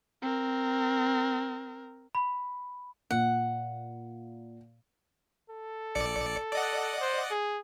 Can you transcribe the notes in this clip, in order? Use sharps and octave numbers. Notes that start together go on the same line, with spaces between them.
C4 A#4
B5
A#2 F#5
A4
A#1 D5 C#7
D5 D#5 F#5
C5
G#4